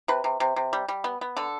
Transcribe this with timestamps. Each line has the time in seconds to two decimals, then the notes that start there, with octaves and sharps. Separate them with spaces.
0.08 C3 B4
0.24 C3
0.40 C3
0.56 C3
0.73 G3
0.88 G3
1.04 B3
1.21 B3
1.37 D3 A4